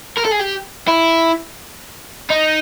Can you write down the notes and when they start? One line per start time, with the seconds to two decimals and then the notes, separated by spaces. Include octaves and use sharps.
0.18 A#4
0.25 A4
0.32 G#4
0.41 G4
0.88 E4
2.30 D#4